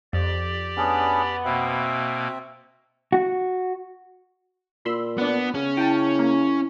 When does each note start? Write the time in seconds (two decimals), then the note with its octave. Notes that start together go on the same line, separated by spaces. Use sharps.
0.13 F2 G4 D5
0.77 B3 C#4 D4 G#4
1.45 B2 A#3 C4 E5
3.12 F#4
4.85 A#2 B5 C6 E6
5.18 B3 D4 F#5
5.54 C#3 C#4
5.77 E4 G5 A5
6.19 A#3